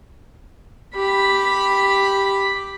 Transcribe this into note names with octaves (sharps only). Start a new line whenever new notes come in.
G4 B5